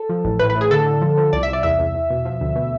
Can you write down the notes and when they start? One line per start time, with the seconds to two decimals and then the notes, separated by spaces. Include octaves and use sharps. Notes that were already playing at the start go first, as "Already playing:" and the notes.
Already playing: A4
0.09 F3
0.25 A1
0.39 A2 B4
0.50 B4
0.55 A2
0.61 G#4
0.71 D3 A4
0.86 D3
1.02 F3
1.17 F3
1.33 C2 D5
1.43 E5
1.48 C2
1.53 D5
1.63 E2 E5
1.79 E2
1.95 E2
2.10 B2
2.25 F3
2.41 D2
2.56 B2